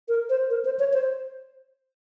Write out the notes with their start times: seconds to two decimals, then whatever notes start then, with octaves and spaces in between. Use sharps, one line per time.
0.08 A#4
0.30 C5
0.50 A#4
0.65 C5
0.79 C#5
0.93 C5